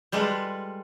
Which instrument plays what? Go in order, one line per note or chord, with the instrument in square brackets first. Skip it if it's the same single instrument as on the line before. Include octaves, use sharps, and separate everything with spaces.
[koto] G3 G#3 F4 A4 B4